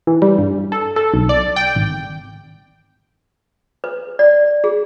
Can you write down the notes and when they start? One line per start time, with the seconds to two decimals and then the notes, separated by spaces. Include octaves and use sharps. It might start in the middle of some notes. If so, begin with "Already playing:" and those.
0.07 E3
0.22 G3
0.39 G2
0.72 A4
0.96 A4
1.14 B1
1.29 D5
1.56 G5
1.75 G#1
3.84 B4
4.19 D5
4.64 G#4